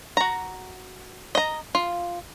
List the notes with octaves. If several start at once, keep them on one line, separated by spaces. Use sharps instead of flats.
F#4 A#5
D#5 A#5
F4